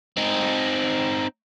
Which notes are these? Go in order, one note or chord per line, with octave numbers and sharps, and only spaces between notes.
C4 D#4